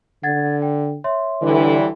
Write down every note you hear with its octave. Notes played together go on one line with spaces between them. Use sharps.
D3 F#5 G#6 A6
G5
C#5 E5 C6
D2 D3 E3 G3